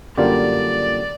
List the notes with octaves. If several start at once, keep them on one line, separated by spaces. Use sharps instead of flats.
F#2 D3 G3 A#3 F4 G4 D5